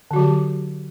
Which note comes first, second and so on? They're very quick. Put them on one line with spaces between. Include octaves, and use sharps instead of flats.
D3 F#4 F#3 G4